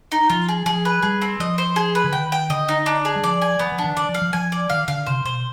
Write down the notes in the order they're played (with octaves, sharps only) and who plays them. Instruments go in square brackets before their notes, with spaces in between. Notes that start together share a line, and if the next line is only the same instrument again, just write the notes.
[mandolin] D#4
[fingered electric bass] F3 [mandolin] F4
[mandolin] G#4
[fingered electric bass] F3 [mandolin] G#4
[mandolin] B4
[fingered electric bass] G3 [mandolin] G#4
[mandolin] C4
[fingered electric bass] F3 [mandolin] D#5
[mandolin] C5
G#4
B4
[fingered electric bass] D3
[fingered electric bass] D#3 [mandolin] G5
[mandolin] G5
[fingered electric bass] D3 [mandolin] D#5
[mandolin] D#4
D4
G#4
[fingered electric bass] G3
[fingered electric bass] F3 [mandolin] D5
[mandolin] G#5
[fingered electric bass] F3 [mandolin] B3
[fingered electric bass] F3
[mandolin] D4
[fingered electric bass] D#3
[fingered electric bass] D#3 [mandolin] D5
[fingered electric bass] F3
[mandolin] F5
[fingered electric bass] F3
[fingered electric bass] F3 [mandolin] G#5
[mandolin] D5
[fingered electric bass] D#3 [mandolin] F5
[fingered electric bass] D3 [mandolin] F5
[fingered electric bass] C3 [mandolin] C5
[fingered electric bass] B2 [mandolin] C5